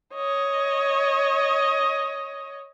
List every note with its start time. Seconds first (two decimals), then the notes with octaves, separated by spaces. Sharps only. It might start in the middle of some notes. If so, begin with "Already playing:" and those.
0.14 C#5 D#5